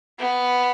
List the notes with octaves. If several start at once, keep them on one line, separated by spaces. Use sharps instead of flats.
B3